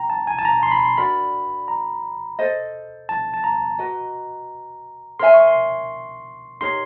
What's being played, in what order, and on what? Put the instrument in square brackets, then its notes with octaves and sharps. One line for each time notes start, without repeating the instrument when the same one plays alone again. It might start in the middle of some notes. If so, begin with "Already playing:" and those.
Already playing: [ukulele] G5 [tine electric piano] A#5
[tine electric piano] A5
G#5
A5
A#5
C6
B5
C6
[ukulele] D4 F#4 A#4 D5 [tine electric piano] B5
[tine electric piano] A#5
[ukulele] A4 C5 D#5
[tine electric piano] A5
A5
A#5
[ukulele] F#4 B4 D#5
[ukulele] A#4 C#5 E5 G#5 [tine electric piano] C6
[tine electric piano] C#6
C6
[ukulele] D#4 G4 A#4 C#5 [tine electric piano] C6